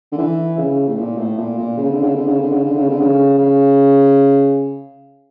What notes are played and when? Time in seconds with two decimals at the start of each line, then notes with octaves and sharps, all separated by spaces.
0.12 D3
0.18 E3
0.58 C#3
0.88 A2
0.97 A#2
1.17 A2
1.38 A#2
1.58 A#2
1.77 C#3
1.91 D3
2.03 C#3
2.15 D3
2.27 C#3
2.40 D3
2.52 C#3
2.65 D3
2.76 C#3
2.89 D3
3.01 C#3
3.38 C#3